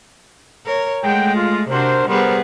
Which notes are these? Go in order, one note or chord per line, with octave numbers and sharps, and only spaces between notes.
A#4 C#5
G#3 A3 F#5 G5
F4
C3 D4 F#4 A#4 C5
G3 B3 G#4 A#4 C5